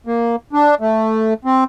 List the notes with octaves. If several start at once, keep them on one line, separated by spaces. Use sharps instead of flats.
A#3
D4
A3
C4